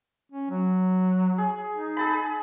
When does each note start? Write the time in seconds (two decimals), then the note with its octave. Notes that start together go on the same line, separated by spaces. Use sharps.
0.32 C#4
0.50 F#3
1.38 G#4
1.72 D#4
1.97 G#4 A5 B5